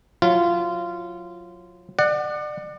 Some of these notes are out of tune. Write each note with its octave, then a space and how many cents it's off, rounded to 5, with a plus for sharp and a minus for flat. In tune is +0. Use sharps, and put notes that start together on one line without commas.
F#3 -30 F4 -20
D5 +35 F#5 +0